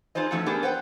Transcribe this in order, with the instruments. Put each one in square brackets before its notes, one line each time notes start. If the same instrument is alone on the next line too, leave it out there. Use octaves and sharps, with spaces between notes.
[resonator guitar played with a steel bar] D#4 F4 G#4 C5 D#5
F3 A3 C#4 D#4 F#4
B3 D4 G4 G#4 A#4
B4 C5 F#5 G5